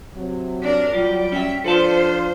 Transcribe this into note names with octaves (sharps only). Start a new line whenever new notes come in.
C3 F#3
D4 A#4
F#3 G3 F4
C#4 E5 G5
F3 D4 F4 A4 B4 C5 A5